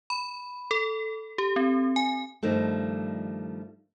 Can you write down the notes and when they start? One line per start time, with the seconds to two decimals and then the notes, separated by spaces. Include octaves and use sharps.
0.10 B5
0.71 A4
1.38 G4
1.56 C4
1.96 G#5
2.43 G2 D#3 F3 G3 A3